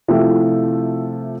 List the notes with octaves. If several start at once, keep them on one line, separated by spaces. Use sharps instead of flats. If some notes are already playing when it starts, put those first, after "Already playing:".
C3 F3 A3 E4 F4 G4